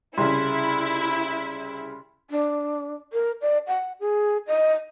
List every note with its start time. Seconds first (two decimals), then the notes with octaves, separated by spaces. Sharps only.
0.18 C2 C#3 E4 C6
2.30 D4
3.13 A#4
3.41 D5
3.67 F#5
4.00 G#4
4.47 D#5